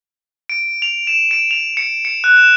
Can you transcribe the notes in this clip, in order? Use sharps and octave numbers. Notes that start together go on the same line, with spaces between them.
D7
F7
E7
D7
F7
C#7
C#7
F#6
E7